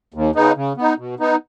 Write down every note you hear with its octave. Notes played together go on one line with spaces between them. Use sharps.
D#2
C#3 B3 D#4
C#3
B3 D#4
B2
B3 D#4